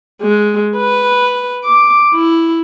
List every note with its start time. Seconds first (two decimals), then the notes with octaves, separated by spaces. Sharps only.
0.22 G#3
0.77 B4
1.64 D6
2.14 E4